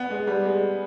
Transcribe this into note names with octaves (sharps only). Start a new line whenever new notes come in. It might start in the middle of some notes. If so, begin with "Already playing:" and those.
Already playing: B3
G#3
G3
G#3